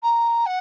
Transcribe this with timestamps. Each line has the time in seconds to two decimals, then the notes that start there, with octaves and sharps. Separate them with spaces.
0.03 A#5
0.46 F#5